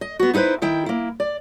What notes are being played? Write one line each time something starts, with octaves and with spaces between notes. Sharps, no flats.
D#5
B3 F#4
D#4 E4 A4 B4 C5
D#3 E4 G5
A#3 E4
D5